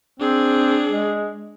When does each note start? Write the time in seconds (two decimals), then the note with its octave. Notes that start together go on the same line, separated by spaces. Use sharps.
0.20 C4 D4 G#4
0.88 G#3